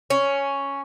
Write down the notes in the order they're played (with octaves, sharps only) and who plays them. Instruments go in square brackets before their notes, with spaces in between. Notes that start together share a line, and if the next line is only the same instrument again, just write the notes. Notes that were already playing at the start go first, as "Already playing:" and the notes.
[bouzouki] C#4